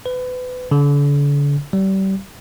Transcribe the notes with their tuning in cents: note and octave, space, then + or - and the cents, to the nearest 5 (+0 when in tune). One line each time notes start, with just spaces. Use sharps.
B4 +30
D3 -40
G3 -30